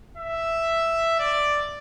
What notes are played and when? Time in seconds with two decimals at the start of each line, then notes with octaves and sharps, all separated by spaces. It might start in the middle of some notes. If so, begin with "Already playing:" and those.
0.17 E5
1.19 D5